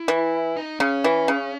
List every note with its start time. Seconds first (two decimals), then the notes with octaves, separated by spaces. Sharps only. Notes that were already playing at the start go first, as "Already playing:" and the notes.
Already playing: E4
0.08 E3
0.57 D#4
0.80 C#3 C#4
1.04 E3
1.28 C#3